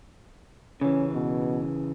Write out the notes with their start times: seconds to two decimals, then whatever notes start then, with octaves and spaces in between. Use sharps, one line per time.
0.81 C#3 E3 C#4
1.14 B2